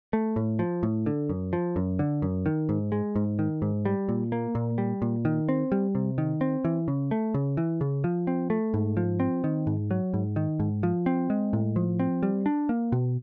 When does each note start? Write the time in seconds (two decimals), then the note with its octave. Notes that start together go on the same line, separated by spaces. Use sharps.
0.13 A3
0.36 A2
0.59 F3
0.83 A2
1.06 D3
1.29 F#2
1.53 F3
1.76 F#2
1.99 D3
2.22 F#2
2.46 D#3
2.69 G#2
2.92 G#3
3.16 G#2
3.39 D#3
3.62 G#2
3.85 G3
4.09 A#2
4.32 A#3
4.55 A#2
4.78 G3
5.02 A#2
5.25 D#3
5.49 C4
5.72 G3
5.95 C3
6.18 D#3
6.41 C4
6.65 E3
6.88 C#3
7.11 A3
7.34 C#3
7.57 E3
7.81 C#3
8.04 F3
8.27 C4
8.50 A3
8.74 G#2
8.97 F3
9.20 C4
9.44 D#3
9.67 G#2
9.91 F#3
10.14 G#2
10.36 D#3
10.60 G#2
10.83 F3
11.06 C4
11.30 G#3
11.53 A2
11.76 F3
12.00 C4
12.23 G3
12.46 D4
12.69 A#3
12.92 B2